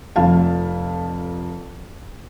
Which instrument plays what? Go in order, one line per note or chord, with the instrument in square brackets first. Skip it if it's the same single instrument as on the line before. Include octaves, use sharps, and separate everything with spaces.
[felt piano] F1 F2 F5 A5